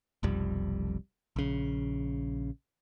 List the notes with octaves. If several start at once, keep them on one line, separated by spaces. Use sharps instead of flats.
F1 B1 F2 G3
A#1 C#3